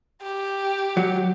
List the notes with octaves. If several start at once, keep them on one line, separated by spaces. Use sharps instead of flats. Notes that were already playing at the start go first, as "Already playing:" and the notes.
G4
F#3